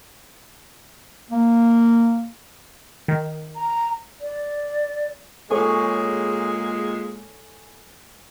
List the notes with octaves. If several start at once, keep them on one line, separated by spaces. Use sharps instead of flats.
A#3
D#3
A#5
D5
A#2 G#3 G#4 A4 C#5 G#5